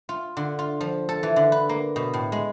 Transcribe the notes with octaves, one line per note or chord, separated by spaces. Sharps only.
F4
D3
F4
F3
A4
E3
D3
B4
A#3
B2
A2
G#3